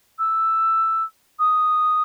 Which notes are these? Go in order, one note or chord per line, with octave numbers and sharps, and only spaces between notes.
E6
D#6